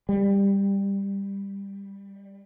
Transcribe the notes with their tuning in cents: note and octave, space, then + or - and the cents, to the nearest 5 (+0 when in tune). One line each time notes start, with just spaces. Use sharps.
G3 +15